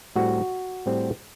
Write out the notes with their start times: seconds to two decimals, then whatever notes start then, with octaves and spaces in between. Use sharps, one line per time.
0.16 A2 G3 C4 F#4
0.86 A2 G3 C4